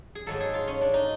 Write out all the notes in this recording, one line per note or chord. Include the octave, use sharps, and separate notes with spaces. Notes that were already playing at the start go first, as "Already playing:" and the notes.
G#4
G#2 D#3 F#3 A#3 A4
G#4
F4
C#4
D4
D#4